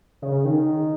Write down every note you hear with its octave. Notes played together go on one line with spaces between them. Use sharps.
C#3
D#3